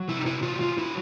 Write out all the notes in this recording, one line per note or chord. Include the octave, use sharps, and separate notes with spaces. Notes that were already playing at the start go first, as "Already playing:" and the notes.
Already playing: F#3
C3 E4
D#4
E4
F#3 F4
F4
F#3 E4